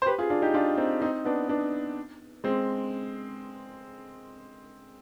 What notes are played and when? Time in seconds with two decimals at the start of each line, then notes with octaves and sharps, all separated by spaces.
0.02 C5
0.06 G4 B4
0.18 F4 G#4
0.30 D4 F4
0.42 D#4 G4
0.54 D4 F4
0.78 C4 D#4
1.02 C4 D#4
1.25 B3 D4
1.49 B3 D4
2.44 G#3 C4